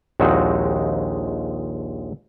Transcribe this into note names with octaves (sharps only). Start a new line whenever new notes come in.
A#1 D#2 G#3 C4 D#4 F#4